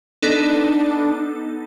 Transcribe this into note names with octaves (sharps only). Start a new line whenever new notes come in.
B3 D4 D#4 A4